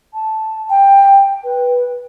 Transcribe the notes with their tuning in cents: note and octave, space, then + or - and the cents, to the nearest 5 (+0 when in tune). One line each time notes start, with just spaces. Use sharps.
A5 -5
G5 +15
B4 -10